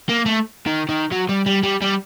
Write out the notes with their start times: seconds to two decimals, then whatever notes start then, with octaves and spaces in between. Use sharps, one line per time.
0.09 A#3
0.26 A3
0.67 D#3
0.89 D#3
1.12 F#3
1.29 G3
1.46 G3
1.63 G3
1.82 G3